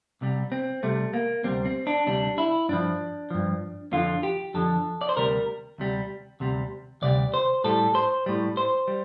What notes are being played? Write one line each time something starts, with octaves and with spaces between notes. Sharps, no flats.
C2 C3 G3
C4
C2 C3 G3 A3
A#3
D2 C3 G3 C4
C4
D4
D2 C3 G3 D4
E4
G2 F3 D4
G2 F3
F2 D3 F3 F4
G4
F2 D3 F3 A4
D5
C5
D2 C3 G3 A#4
D2 C3 G3
D2 C3 G3
D2 C3 G3 D5
C5
A2 G3 A4
C5
A2 G3
C5
G3